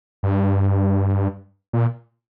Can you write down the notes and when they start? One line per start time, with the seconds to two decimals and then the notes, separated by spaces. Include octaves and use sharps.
0.23 G2
1.73 A#2